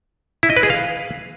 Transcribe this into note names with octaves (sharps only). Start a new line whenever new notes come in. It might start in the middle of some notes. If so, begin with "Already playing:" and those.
E4
D#5
B4
G#4
F5